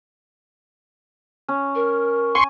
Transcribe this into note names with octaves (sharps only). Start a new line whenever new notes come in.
C#4
A#4
G#5 C6 C#6